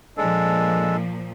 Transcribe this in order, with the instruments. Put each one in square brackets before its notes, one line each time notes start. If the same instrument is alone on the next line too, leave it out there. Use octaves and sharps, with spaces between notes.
[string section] A#2 F3 [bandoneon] G#3 D4 A4